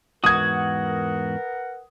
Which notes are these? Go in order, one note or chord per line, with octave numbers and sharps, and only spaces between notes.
E2 G#2 F#4 A#4 B4 F#5 D#6 G#6